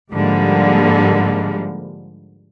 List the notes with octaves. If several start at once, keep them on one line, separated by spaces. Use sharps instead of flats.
G#2 D3 F3 G3 G#3 A#3